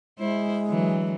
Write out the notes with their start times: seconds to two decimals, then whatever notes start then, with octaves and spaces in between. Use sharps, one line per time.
0.19 G#3 E4 C5
0.67 D3 E3 F#3